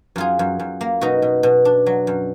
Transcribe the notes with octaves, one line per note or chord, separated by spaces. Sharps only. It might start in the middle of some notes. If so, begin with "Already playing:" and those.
F#2 F4 G#4
F#2
F#2
A#3
B2 D#4 F#4
B2
B2
D4
F#3
F#2